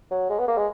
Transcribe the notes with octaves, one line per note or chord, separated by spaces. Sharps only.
F#3
G#3
B3
A#3
G#3